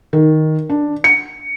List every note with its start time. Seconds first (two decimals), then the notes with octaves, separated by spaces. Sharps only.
0.13 D#3
0.69 D4
1.04 C#7